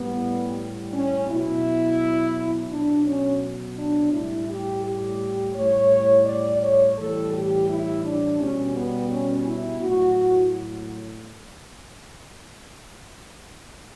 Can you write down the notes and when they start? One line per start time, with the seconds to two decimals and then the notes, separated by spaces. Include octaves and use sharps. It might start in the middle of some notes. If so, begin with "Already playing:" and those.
Already playing: A2 G3 B3
0.93 C#4
1.29 B2 F#3 E4
2.71 B2 F#3 D4
3.06 C#4
3.77 D4
4.12 A2 G3 E4
4.48 G4
4.84 G4
5.55 A2 G3 C#5
6.26 D5
6.62 C#5
6.97 A2 E3 G3 A4
7.33 G4
7.68 E4
8.04 D4
8.39 B2 G3 C#4
8.75 B3
9.10 C#4
9.46 E4
9.81 A2 F#3 F#4